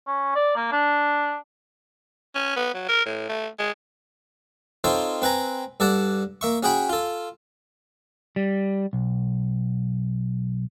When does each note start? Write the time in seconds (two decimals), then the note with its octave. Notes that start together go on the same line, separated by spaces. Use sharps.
0.07 C#4
0.35 D5
0.56 A#3
0.72 D4
2.35 C#4
2.56 B3
2.74 F#3
2.89 A#4
3.06 A2
3.29 A3
3.59 G#3
4.84 C4 D#4 F4 A4 C5 C#5
5.22 C4 B4 G#5 A#5
5.80 G2 A4 D5 F#5 A5
6.41 A#3 E5 C#6
6.63 C#4 F#4 G#4 G5 B5
6.89 F4 A4
8.36 G3
8.93 B1